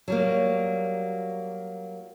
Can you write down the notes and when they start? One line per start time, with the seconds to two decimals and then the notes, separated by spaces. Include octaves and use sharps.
0.08 F#3 G3 A#3